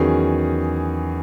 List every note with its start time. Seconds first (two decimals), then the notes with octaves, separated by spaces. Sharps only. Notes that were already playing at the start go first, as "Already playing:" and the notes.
Already playing: E2 D#3 F#3 C#4 G#4